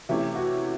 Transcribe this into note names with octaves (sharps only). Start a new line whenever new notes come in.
C3 E3 A3 C#4 E4 G4
F#4